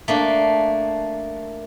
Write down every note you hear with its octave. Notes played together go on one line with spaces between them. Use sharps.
A3 A#3 D4